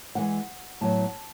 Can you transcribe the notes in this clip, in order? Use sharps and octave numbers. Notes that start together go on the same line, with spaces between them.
A2 E3 G#3 F#5
A2 F#3 B3 A5